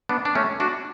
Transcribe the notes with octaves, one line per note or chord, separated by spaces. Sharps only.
B3 D4
D4
A3 C#4
D4 F#4